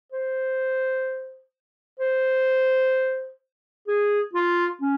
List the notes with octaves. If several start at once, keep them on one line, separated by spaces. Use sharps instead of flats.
C5
C5
G#4
F4
C#4